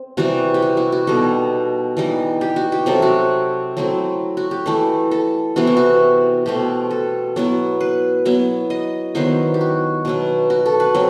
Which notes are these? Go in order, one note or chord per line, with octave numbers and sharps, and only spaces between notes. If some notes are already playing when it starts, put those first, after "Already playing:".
Already playing: C4
C3 E3 G3 F#4
G4
F#4
E4
F#4
B2 G3 D#4 A4
E3 G3 D#4
G4
F#4
G4
C3 F#3 C4 A4
F#4
F#3 A3 C4 E4
F#4
G4
E3 A3 E4
A4
C3 E3 B3 F#4
E4
F#4
B2 A3 C4 G4
A4
F#3 B3 E4
B4
F#3 B3 E4
D#5
D#3 F#3 B3 E4 C5
G4
F#4
B2 F#3 B3
F#4
A4
B4
F#3 C4